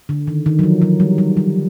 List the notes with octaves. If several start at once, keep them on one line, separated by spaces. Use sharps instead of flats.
D3
D#3
D#3
F#3
F3
F#3
G3
G3
G3